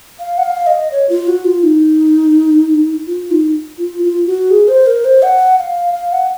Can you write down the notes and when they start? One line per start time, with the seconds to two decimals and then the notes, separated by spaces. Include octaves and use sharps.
0.20 F5
0.38 F#5
0.43 F5
0.67 D#5
0.92 C#5
1.09 F4
1.27 F#4
1.45 F4
1.63 D#4
3.07 F4
3.31 D#4
3.78 F4
4.03 F4
4.26 F#4
4.51 G#4
4.68 C5
4.86 A#4
5.05 C5
5.22 F#5
5.58 F5
5.94 F5
6.12 F#5